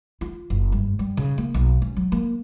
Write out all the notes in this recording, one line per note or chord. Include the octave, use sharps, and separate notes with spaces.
F4
F#1
G2
G3
C#3
A#3
B1
C#4
F#3
A#3